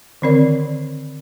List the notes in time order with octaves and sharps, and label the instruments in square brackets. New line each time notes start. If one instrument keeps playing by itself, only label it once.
[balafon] D3 D#3 C4 A#4 D5